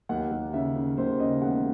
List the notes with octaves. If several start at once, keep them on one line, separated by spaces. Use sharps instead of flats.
D#2 F#5
D#2
C#3 E5
C#3
D#2 C5
C#3 D#5
E1 F#5